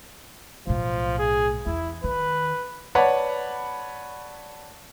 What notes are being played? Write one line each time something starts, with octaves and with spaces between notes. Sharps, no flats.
B1 A2 F3
G#4
E2 E4
D#3 B4
B4 C#5 D5 F#5 A5 B5